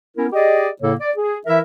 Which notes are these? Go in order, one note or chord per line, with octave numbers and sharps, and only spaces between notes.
B3 C#4 E4 A#4
G4 G#4 D5 D#5
A2 C#3 A#3 A4 C#5
D5
G#4
E3 E4 A#4 E5